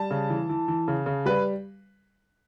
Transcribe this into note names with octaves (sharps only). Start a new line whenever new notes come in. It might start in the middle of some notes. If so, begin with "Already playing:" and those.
Already playing: G3 A5
C#3
E3
E3
E3
C#3
C#3
G3 B4